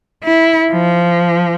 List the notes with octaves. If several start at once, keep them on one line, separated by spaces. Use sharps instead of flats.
E4
F3